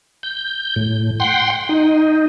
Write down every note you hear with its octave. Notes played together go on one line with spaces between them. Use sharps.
G6
A2
F#5 G5 C6
D#4